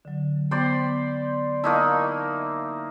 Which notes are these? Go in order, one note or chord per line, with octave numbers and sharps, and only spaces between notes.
D3 F#3
B3 C5 D5 G5 B5
A#3 D#4 E4 A5 C#6